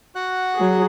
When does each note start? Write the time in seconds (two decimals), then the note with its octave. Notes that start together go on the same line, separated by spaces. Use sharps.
0.15 F#4 F#5 F#6
0.55 F#3 G#4